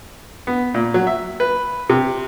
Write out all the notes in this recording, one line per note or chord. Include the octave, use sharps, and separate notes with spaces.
B3
A#2
F#3
E5
B4
C3